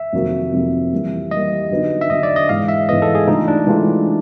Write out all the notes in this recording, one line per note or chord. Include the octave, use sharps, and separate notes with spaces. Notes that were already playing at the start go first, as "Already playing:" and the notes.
Already playing: E5
F2 C3 D#3 F#3 A#3
F2 C3 D#3 F#3 A#3
E3 G3 A#3
E3 G3 A#3 D#5
D3 F#3 B3 D#4
E5
D3 F#3 B3 D#4 D#5
D5
D#5
G#2 E3 G#3 B3 F5
E5
G#2 E3 G#3 B3 D#5
A4
G#4
E3 A3 D4 D#4 F4
D4
E3 G#3 A3 D4 F4